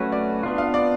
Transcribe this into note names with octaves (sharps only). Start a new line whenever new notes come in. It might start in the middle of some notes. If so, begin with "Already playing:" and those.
Already playing: F#3 A3 C#4 F#4 B4 C#5
D5
B3 D4 F4
F5
D5